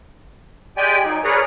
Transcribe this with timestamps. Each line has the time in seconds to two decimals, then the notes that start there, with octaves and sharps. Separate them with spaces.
0.77 G#3 G4 D5 G5 G#5
1.05 F#3 D#4
1.24 G#4 A#4 B4 C#5 D5 A#5